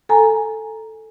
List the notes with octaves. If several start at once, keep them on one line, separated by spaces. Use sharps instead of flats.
A4 G#5 A#5